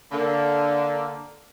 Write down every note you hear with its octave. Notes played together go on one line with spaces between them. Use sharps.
D3 A#3